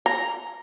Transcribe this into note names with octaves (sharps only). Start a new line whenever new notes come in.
A#5